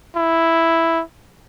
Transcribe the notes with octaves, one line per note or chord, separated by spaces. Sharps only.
E4